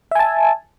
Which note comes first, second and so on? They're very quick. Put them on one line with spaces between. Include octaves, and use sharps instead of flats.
E5 G#5 A5